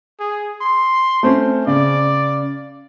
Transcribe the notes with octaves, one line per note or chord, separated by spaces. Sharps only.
G#4
C6
A3 C4 C#4
C#3 D5